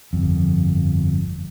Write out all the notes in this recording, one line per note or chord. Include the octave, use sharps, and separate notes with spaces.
G1 F2